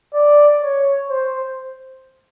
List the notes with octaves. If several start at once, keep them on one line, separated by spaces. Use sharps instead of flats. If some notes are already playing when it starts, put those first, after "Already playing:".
D5
C#5
C5